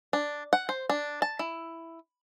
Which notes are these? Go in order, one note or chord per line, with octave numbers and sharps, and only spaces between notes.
D4
F#5
C5
D4
A5
E4